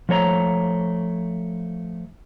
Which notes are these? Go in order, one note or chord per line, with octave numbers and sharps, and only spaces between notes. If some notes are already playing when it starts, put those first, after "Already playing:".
F3 A3 C#5 D#5 A#5